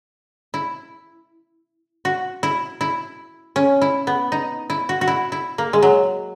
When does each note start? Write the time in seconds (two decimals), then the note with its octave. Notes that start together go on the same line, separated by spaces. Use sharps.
0.54 E4
2.05 F#4
2.43 E4
2.81 E4
3.56 C#4
3.81 E4
4.07 B3
4.32 D#4
4.70 E4
4.89 F#4
5.01 F#4
5.07 E4
5.32 E4
5.58 A#3
5.73 G#3
5.82 F#3